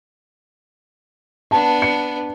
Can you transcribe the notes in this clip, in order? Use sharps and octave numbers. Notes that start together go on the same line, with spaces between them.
B3 D4 A5
C#7